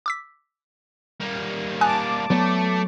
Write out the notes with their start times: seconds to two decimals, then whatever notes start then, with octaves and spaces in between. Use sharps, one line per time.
0.06 D6 E6 B6
1.21 G3 A#3
1.81 G#5 A5 D6 D#6 F#6
2.30 F#3 A3 B3 D5